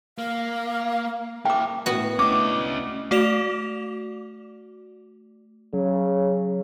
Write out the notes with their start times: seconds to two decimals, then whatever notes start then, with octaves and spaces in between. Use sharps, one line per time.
0.18 A#3 F5
1.45 A#3 E4 G5 D6
1.86 A2 B3 F#4
2.19 A3 C#4 D4 E4 D#5 D6
3.11 A3 F#4 D5 D6 E7 F7
5.74 C#3 F#3